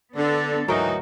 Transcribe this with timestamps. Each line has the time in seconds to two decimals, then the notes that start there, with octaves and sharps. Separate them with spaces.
0.16 D3 B3 D4 A4
0.68 D2 G#2 E3 F#3 D#4 F#4 A#4 G5